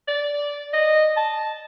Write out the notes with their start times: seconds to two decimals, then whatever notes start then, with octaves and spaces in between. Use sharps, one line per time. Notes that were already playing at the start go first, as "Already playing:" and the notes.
0.08 D5
0.73 D#5
1.17 A5